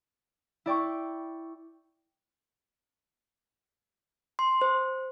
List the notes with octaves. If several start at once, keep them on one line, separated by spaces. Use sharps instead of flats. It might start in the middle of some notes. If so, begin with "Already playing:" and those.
E4 D5 G5 C#6
C6
C5